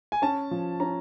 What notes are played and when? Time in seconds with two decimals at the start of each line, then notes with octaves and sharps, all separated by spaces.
0.12 G#5
0.22 C#4 A5
0.51 F3
0.80 C#4 A#5